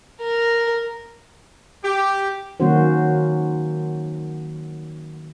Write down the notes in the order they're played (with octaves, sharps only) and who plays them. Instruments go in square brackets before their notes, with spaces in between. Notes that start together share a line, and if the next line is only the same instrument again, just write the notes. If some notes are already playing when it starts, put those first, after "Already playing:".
[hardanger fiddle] A#4
[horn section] G4
[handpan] D#3 F#3 A#3 C#4 F#4 C5